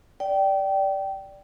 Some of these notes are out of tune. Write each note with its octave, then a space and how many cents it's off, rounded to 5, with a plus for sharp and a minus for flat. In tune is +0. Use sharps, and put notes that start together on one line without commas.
D5 +0 G5 -20